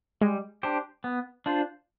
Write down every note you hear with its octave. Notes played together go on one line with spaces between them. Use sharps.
G3 G#3
D4 G4 C5
B3
D4 F4 C5